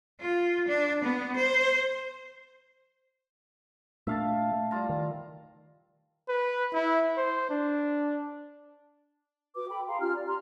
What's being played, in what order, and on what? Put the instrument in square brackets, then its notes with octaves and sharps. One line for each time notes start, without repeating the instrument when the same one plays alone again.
[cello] F4
D4
B3
C5
[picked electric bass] A#2 A3 D4 [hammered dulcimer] E5 F5 A5
[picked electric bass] A3
[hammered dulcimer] G3 F4 A#5
[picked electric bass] D#3
[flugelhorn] B4
E4
C5
D4
[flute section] F#4 B4 D6
A4 G5 B5
G#4 F5 A#5 C6
C#4 F4 G4 F6
D5
G4 A#5 C6 F6